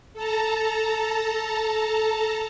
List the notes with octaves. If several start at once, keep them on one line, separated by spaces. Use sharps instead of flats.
A4 A5 A#5